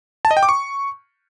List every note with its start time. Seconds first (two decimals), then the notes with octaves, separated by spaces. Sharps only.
0.25 A5
0.31 D#5
0.37 G5
0.43 D6
0.49 C#6